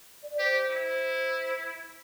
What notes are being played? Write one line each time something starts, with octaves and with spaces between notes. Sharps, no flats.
D5
G4 C5
E4